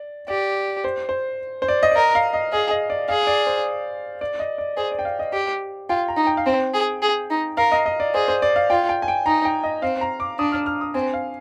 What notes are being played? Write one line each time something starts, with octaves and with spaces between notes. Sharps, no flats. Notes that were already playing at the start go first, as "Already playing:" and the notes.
Already playing: D5
G4 D5
C5
C5
C5
D5
D#5
D5
A#4 D#5
F5
D#5
G#4 D#5
D#5
D5
G#4 F5
D5
C5
D5
D#5
D5
G#4 C5
D5
G5
F5
D#5
G4
F4 G5
A#5
D#4
G5
F5
C4 G5
G#4
G#4
D#4
A#4 F5
D#5
D#5
D5
G#4 C5
C5
D5
F5
F4 G5
G5
G#5
G5
D#4 A#5
G5
D#5
C4 F5
A#5
D6
D4 D#6
F6
F6
D#6
C4 G#5
F5